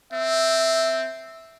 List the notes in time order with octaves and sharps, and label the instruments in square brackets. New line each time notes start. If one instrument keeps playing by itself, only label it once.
[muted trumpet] C4 [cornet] E5